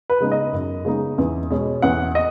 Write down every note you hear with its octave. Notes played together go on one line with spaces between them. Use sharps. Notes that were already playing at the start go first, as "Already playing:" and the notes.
B4
C#3 G#3 B3 D#4
D#5
F#2
C#3 G#3 B3 D#4
E2
B2 G#3 C#4
E2 F#5
D#5